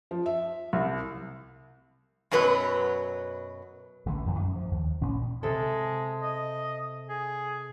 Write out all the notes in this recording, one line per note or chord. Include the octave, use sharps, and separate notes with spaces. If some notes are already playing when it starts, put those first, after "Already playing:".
F3
E5
C2
F#2 B2 F#3 B4
A1 D3 E3
A1 F2 A#2 D#3
F#2
F3
D#2
A1 A#2 C#4
C3 G#3 A4
D#5
G#4